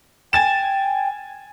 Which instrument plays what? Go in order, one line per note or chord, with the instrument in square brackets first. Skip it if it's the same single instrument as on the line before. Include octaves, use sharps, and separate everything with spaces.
[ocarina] G5 [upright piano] G#5 A6 E7